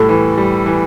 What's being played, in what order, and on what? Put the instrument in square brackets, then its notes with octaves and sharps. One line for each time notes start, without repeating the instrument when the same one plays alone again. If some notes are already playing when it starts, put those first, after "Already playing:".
Already playing: [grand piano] A2 G3 [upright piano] A4
[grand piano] E3
G3
E3